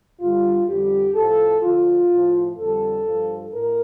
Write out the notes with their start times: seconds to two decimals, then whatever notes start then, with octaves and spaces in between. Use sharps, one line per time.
0.20 G2 D3 G3 F4
0.67 F2 D3 G3 G4
1.14 A2 F3 A4
1.62 D2 D3 F3 F4
2.11 A2 F3
2.57 F2 D3 G3 A4
3.05 G2 F3
3.53 A2 A#4